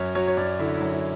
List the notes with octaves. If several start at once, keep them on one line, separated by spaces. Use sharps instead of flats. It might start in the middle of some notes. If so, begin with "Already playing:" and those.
Already playing: F#2 C#5
F#3 C#5
C#5
F#2 D5
D3 E4
E4
F#2
E4